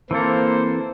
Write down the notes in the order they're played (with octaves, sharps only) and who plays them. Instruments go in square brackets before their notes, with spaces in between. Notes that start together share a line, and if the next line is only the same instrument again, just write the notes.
[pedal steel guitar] E3 C4 A4 [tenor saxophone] A#3 [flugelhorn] C5